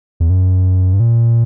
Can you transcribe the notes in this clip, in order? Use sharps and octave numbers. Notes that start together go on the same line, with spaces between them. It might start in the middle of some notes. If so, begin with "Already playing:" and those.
E2
F#2
G2
A#2